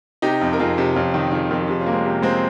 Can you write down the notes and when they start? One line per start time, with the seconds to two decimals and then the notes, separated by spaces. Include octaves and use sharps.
0.22 C3 D#4 G4
0.41 F2
0.53 A#4
0.59 F2 F4 G#4
0.78 C3
0.95 F2 C#4 F4
1.13 D#3 D#4 G4
1.32 D#3 F4 G#4
1.50 F2 G4 A#4
1.61 G4
1.68 C3 F4 G#4
1.81 C#4 F4
1.86 A#3
1.93 G#3 C4
2.05 C3
2.22 G#3 A#3 C4